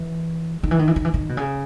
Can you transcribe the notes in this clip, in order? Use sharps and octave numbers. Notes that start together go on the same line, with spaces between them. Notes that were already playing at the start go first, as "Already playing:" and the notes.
Already playing: E3
D#3
E3
D#3
E3
D#3
E3
D#3
B2
C#3